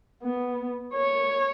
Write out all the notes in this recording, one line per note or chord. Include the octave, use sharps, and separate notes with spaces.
B3
C#5